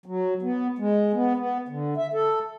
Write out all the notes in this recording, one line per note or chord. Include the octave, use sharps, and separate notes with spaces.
F#3
B3
G#3
B3
B3
D3
E5
A4